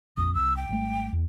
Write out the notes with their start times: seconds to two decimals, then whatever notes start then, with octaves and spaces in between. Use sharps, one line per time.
0.17 A#1 F2 D#6
0.35 C2 E6
0.57 G5
0.69 G#1 G3 A3
1.13 E2